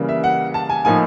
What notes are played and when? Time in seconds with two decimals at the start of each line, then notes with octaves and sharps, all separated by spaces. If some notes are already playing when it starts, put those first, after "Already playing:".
Already playing: C#3 E3 G3 A#3
0.09 E5
0.24 F#5
0.54 A5
0.69 G#5
0.85 A2 F3 A#3 D#4 G#5